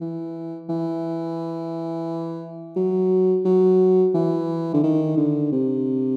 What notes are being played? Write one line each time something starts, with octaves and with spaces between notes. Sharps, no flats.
E3
E3
F#3
F#3
E3
D3
D#3
D3
C3